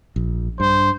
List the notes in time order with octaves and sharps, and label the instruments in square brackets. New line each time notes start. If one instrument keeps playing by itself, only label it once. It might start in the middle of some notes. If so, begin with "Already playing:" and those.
[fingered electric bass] A#1
[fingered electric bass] G2 [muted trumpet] C5